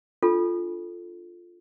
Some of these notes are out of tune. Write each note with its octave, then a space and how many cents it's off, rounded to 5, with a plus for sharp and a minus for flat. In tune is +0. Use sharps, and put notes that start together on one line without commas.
D4 +0 F4 +0 A4 +0